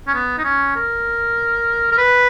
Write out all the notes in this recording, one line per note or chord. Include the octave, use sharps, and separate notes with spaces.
C#4
B3
D#4
C#4
A#4
A#4
B4